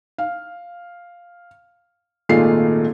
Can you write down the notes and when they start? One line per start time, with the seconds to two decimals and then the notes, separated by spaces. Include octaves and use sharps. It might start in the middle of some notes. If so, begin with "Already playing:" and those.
0.18 F5
2.29 G#1 A#2 G#3 A3 F4 C7